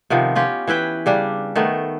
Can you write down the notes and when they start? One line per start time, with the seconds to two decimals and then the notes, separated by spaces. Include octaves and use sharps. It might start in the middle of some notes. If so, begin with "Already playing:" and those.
0.10 C3 D#3 F3 B3
0.35 C#4 F4 G4
0.67 E3 E4 B4 G5
1.06 C#3 G3 D4
1.55 D#3 A3 B3